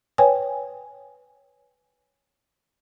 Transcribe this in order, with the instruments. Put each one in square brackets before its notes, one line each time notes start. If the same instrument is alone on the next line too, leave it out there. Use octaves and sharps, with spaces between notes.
[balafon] B4 C#5 G5 G#5